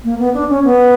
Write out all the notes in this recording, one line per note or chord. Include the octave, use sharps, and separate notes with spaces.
A#3
B3
D4
C#4
B3